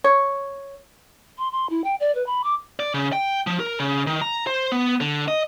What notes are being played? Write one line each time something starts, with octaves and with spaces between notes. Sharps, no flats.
C#5
C6
C6
E4
G5
D5
B4
B5
D6
D5
C#3
G5
F3
A#4
C#3
D#3
A#5
C5
B3
D3
D#5